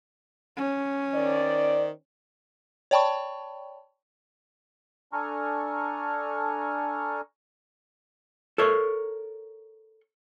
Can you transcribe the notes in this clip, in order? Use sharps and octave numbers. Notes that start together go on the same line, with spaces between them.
C#4
D#3 C5 D5
C#5 D5 G5 A5 B5 C#6
D4 A4 G#5 A#5 C#6 F6
A4 A#4 C#5